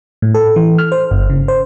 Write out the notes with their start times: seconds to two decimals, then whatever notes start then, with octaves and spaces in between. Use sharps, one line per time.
0.22 A2
0.34 A4
0.56 E3
0.78 F6
0.92 C5
1.11 G1
1.30 C#3
1.48 C5